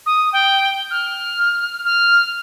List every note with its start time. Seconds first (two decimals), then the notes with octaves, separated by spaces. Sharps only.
0.06 D#6
0.33 G5
0.91 F6
1.84 F6